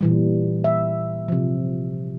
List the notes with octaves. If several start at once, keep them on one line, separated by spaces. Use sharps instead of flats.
A#2 E3 G3
E5
C3 F3